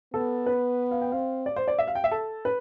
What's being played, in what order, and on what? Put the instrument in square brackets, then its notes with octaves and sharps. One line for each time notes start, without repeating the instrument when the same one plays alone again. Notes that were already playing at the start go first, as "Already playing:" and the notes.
[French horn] B3 [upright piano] A4
[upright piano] B4
F5
G5
[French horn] C4 [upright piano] F5
[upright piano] D5
C5
D5
E5
F5
G5
E5
A4
B4